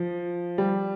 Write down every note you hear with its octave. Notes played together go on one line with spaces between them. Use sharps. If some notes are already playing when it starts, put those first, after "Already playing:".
Already playing: F3
G3